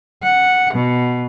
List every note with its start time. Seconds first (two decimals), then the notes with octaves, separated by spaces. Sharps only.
0.23 F#5
0.74 B2